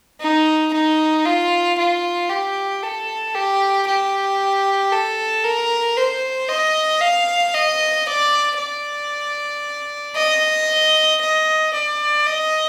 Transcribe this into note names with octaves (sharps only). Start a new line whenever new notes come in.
D#4
D#4
F4
F4
G4
A4
G4
G4
A4
A#4
C5
D#5
F5
D#5
D5
D5
D#5
D#5
D5
D#5